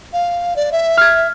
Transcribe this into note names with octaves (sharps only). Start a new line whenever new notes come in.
F5
D5
E5
F6 G#6